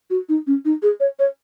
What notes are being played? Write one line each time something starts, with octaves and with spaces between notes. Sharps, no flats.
F#4
D#4
C#4
D#4
G#4
C#5
C#5